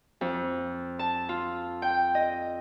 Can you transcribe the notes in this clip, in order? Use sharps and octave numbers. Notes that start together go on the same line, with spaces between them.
F2
A5
F4
G5
D#5